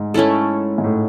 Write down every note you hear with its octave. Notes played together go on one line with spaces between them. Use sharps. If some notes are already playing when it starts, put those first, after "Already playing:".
Already playing: G#2
A3 C#4 E4 A4
G#2
A2